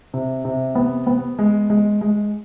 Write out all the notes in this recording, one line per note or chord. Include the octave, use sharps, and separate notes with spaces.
C3
C3
B3
B3
G#3
G#3
G#3